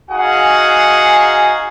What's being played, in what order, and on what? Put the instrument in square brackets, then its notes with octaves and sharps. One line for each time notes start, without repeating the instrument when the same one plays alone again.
[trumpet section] D#4 F#4 G#4 F5 F#5 G#5